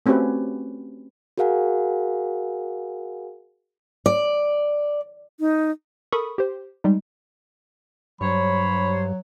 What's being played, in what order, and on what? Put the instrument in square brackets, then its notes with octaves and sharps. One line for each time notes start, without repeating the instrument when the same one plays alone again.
[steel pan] A3 C4 C#4 F#4 G4 B4
[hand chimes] F#4 G#4 A#4 F5 F#5 G#5
[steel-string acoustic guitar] D5
[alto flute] D#4
[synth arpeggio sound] A4 A#4 B5 C#6 D#6
G4 C5
G3 G#3 D#4
[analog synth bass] G2 [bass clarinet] F#3 [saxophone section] C5 C#5 [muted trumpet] B5